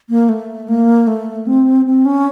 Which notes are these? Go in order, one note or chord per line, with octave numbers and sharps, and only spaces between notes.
A#3
A3
A#3
A3
C4
C4
C#4